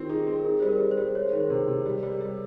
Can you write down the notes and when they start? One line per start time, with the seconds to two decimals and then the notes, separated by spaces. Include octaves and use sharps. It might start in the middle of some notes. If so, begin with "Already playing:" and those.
Already playing: D#3 C4 F4 G4
0.09 D#4 G#4
0.27 C4
0.38 A#4
0.45 D#4 G#4
0.60 G3 C5
0.68 A#4
0.80 G3
0.91 C5
0.97 G3
1.15 G#3 C#5
1.23 C5
1.32 D#3 A#4
1.40 C5
1.50 C3
1.68 C3
1.86 G3
2.03 G3
2.21 G3